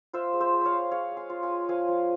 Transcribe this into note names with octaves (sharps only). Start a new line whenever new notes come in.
F4 C5 E5
G#3
C5 E5
G#3
C#5 E5 F5
G#3
G#3 C#5 F5
G#3
F5 G#5
F4
F5 G#5
G#3
F3 F5 G#5
F3